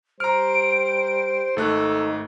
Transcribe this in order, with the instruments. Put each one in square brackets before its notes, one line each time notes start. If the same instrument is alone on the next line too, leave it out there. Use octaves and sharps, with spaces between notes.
[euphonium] G3 [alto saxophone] C5 [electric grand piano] A#5 F6 [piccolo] D7
[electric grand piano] G#1 A3 F#6 [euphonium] D#4 [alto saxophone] A4